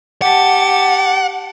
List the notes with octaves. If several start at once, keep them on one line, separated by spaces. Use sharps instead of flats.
G4 F#5 A5